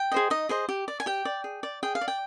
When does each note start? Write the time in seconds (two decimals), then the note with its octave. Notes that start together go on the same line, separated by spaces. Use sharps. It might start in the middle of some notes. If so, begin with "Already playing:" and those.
Already playing: G5
0.12 G#4 C5 D#5
0.30 D#4 D#5
0.49 G#4 C5 D#5
0.69 G4
0.88 D5
1.00 G#5
1.06 G4 G5
1.25 D5
1.44 G#4
1.63 D5
1.83 G#4 G5
1.95 F5
2.01 D5
2.08 G5